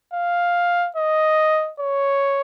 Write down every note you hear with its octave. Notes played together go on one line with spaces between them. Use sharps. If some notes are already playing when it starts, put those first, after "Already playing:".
F5
D#5
C#5